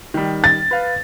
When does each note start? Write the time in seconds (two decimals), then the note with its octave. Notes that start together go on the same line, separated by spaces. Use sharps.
0.14 D#3 G3
0.44 A6
0.71 B4 F5